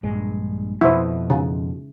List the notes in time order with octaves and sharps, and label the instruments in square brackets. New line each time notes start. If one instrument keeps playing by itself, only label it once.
[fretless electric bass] A#1 G2 G#3
[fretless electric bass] F2 B2 F3 [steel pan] E4 C5
[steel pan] C#3